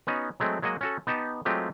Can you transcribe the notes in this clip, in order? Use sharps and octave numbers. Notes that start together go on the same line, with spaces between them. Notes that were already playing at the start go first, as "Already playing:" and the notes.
B3 C#4 D#4 F#4
F#3 G#3 A3 C4
F#3 G#3 A#3 F#4 D#5
C#4 F#4 A4
B3 D#4 G4 A5
F#3 G#3 A3 C4 F4 G4